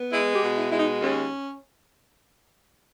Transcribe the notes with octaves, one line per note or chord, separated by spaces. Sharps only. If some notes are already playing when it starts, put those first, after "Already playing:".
Already playing: B3
G#3 E4
G4
B2
E4
G#3 E4
D#4
D#2 C#4